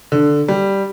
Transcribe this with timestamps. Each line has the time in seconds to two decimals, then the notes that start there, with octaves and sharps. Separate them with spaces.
0.12 D3
0.48 G3